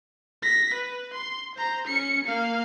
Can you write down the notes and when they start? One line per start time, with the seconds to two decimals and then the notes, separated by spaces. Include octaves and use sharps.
0.42 A#6 B6
0.74 B4
1.14 C6
1.56 C5 A#5
1.87 C#4 C#7
2.25 A#3 F5